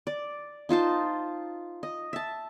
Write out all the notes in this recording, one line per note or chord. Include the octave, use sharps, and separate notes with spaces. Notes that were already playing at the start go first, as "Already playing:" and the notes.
D5
D#4 F4 C5 A5
D#5
E5 A5